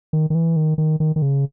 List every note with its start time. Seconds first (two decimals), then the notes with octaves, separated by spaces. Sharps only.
0.13 D#3
0.30 D#3
0.35 E3
0.56 D#3
0.78 D#3
1.00 D#3
1.16 D#3
1.22 C#3